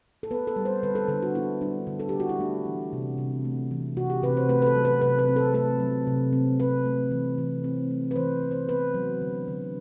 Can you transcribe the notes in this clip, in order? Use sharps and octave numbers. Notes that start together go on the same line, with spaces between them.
A4
B3 B4
A4
G3
C5
D3 B4
A4
D3 A4
F#4
B3 E4
G3 D4
D3
A4
D3 G4
F#4
E4
A3 D4
E3
C3
C3
A3
E3
C3 F#4
G4
C3 B4
C5
A3 B4
B4
A4
F#3
B4
C3 B4
B4
C4
A4
A3 A4
F#3
C3
C4
C4 B4
A3
E3
E3
C4
A3
B4
E3 C5
E3
C5
B3 B4
F#3
D3
D3